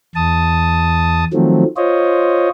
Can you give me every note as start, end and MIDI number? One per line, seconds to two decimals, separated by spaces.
0.15 1.24 40
0.15 1.24 81
0.15 1.24 87
1.33 1.64 51
1.33 1.64 53
1.33 1.64 54
1.33 1.64 57
1.33 1.64 60
1.77 2.49 65
1.77 2.49 72
1.77 2.49 73
1.77 2.49 75